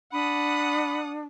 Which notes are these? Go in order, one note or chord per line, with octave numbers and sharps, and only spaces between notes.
D4 F#5 B5 D#6